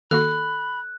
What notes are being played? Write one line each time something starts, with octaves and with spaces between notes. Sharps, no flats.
D#3 A#3 F#4 A4 B5 F#6